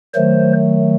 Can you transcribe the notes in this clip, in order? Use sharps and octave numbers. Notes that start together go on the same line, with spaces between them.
D#3 F#3 A3 C5